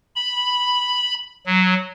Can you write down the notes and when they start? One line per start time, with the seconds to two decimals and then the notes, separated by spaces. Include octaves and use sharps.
0.16 B5
1.46 F#3